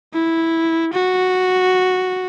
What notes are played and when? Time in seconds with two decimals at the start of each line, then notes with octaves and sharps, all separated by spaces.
0.13 E4
0.93 F#4